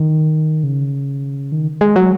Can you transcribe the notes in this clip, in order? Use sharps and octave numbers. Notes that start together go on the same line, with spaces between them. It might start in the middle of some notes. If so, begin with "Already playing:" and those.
Already playing: D#3
C#3
D#3
G#3
F#3